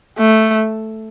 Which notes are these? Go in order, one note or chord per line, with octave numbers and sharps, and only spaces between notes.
A3